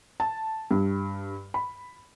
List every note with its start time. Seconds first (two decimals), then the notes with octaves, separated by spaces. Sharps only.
0.20 A5
0.71 G2
1.54 B5